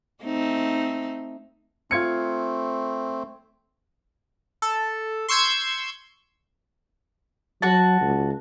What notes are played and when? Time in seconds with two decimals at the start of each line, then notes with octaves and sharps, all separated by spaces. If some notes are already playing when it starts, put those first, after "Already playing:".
0.24 A3 C4 D#4
1.91 A3 C4 F4 G#6 C#7
4.62 A4
5.28 C6 C#6 E6 G6 G#6
7.62 F#3 F#4 A5
8.01 C#2